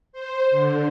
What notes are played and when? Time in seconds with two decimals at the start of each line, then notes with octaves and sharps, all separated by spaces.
0.13 C5
0.51 D3